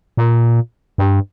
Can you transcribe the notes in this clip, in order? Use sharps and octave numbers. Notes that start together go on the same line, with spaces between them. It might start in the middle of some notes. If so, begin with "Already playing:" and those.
A#2
G2